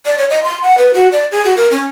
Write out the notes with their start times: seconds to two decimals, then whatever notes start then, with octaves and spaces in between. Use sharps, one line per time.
0.06 D5
0.18 C#5
0.30 D#5
0.43 C6
0.63 F#5
0.78 B4
0.94 F#4
1.12 D5
1.32 G#4
1.45 F#4
1.57 A#4
1.71 C#4